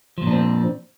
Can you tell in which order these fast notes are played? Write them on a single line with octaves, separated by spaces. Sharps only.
F3 A#2 D4 C4